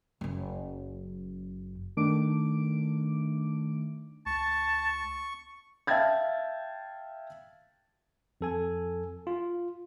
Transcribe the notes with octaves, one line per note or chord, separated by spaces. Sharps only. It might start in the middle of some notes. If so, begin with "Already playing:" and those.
F#1 F#2
D#3 A3 D4 D6 D7
C#2 A5 C#6
E5 F5 G5 A5 G#6 A6
F2 A4 G#5
F4